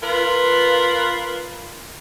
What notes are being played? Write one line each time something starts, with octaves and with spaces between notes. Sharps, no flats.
F4 A#4 B4